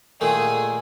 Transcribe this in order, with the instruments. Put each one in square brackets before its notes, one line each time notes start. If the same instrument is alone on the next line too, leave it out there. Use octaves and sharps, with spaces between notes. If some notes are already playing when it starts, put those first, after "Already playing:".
[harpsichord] A#2 D#3 A3 [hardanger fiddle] G#4 G#5